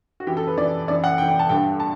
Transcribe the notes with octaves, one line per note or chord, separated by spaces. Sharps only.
F#4
F#2 E3 G4
A4
B4
F#2 E3 D5
F#2 E3 D5
F#5
F#2 E3 G5
G5
A5
G2 D3 G5
A5